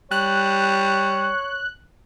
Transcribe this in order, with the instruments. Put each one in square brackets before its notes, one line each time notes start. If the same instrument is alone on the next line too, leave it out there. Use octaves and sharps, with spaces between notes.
[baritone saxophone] G3 [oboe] C#5 [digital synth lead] F#6